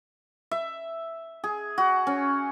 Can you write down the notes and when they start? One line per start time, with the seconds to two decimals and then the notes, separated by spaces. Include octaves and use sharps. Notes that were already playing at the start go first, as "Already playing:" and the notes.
0.51 E5
1.44 G#4
1.78 F#4
2.07 C#4